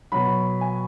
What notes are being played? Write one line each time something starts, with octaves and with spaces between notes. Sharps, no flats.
B2 F#3 B5
G#5